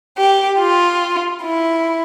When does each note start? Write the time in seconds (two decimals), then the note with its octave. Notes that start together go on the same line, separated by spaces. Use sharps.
0.18 G4
0.60 F4
1.44 E4